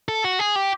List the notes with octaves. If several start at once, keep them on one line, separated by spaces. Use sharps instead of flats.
A4
F#4
G#4
G4